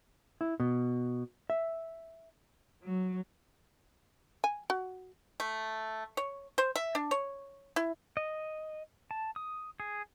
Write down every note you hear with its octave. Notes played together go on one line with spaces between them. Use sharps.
E4
B2
E5
F#3
G#5
F#4
A3
C#5
C5
E5
D4
C#5
E4
D#5
A5
D#6
G#4